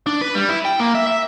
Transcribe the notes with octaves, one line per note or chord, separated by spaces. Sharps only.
D4
B4
G3
E4
G5
A#3
E5
E5